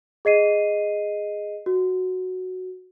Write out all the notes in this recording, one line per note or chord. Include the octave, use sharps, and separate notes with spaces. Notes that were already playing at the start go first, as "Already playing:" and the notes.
G#4 D#5 C7 D#7
F#4